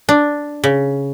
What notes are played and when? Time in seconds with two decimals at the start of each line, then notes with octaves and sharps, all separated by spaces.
0.09 D4
0.64 C#3